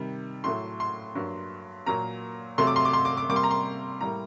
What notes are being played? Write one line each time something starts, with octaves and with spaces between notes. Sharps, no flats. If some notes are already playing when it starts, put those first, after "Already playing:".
Already playing: C3 D#3 G3
A2 F#3 A3 C6
C6
G2 F#3 A#3
A#2 F#3 A#3 A#5
C3 F#3 A3 C6
D6
C6
D6
C6
D6
D6
C3 G3 A#3 D6
C6
A#5
C6
A2 G3 A#3 A#5